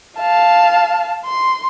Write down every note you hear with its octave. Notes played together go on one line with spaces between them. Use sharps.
F5 A5
C6